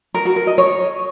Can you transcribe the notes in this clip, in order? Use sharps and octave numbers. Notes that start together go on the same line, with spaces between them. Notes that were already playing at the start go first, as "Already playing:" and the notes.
A#4
F#4
A#4
D#5
C#5